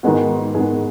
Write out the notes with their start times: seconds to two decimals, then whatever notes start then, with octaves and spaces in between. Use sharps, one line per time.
0.03 G#2 D#3 G#3 B3 F#4
0.55 G#2 D#3 G#3 B3 G#4